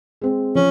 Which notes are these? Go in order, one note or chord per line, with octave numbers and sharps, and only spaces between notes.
G#3 C4
F3 C#4